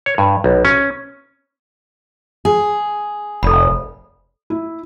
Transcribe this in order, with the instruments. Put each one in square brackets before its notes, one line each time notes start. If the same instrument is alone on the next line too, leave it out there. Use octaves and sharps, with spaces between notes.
[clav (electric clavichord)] C#5
G2
B1
C#4
[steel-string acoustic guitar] G#4
[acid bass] F1 [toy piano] A4 D5 B5
[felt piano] E4